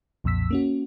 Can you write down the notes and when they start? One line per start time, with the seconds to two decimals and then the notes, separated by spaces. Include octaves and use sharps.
0.24 B1 F2 A#2 E6 B6
0.51 A#3 C#4 F#4